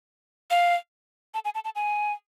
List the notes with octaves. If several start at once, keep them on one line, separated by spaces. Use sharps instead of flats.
F5
A5
G#5
A5
A5
G#5